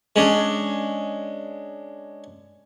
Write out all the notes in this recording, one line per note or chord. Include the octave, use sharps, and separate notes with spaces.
G#3 C#4 D4